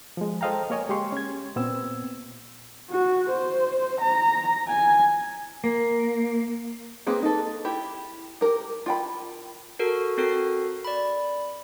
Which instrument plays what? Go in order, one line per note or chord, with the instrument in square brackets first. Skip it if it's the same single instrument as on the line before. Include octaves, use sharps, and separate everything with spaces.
[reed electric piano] F3 G#3
A4 C5 D#5 F5 G5 A#5
A#3 A#4 C#5 D#5 G#5
G#3 G4 C6 C#6
C#4 G#6
A#2 B3 C4 E6
[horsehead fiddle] F#4
C5
A#5
G#5
[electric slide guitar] A#3
[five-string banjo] A#3 C4 G#4 B4
D#4 A4
E4 G4
G4 A#4
F4 G5 B5
[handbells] F#4 A4 A#4
C4 F#4 A4 A#4 C7
D5 B5